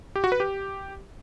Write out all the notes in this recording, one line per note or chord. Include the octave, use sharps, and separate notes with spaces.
G4
F#4
B4
G4